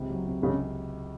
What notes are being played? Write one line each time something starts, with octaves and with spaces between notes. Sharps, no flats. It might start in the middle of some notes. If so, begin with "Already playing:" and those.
Already playing: C#2 C3
F#3
C3
C#2 C#3